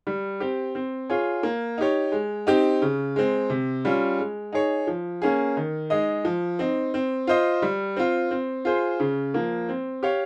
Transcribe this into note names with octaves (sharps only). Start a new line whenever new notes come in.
G3
C4 G4
C4
F4 G#4 C#5
A#3
D#4 G4 C#5
G#3
C4 D#4 G4
C#3
G#3 C4
C3
G3 C#4 F4
G#3
D#4 G#4 C#5
F3
A#3 C#4 G#4
D#3
G#3 D#4 G#4 D#5
F3
C4 D#4
C4
F4 C5 D#5
G3
C4 F4
C4
F4 G#4 C5
C#3
F3 A#3
C4
G4 C#5 F5